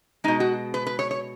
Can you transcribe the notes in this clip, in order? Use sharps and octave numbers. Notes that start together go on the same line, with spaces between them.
B2 G#3 D#4
F#4
B4
B4
C#5
C#5